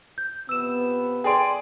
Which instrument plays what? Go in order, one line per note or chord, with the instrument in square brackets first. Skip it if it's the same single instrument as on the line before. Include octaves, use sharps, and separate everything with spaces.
[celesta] G6
[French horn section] C3 F3 B3 [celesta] E6 E7
[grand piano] G#4 D5 D7 [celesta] G5 C6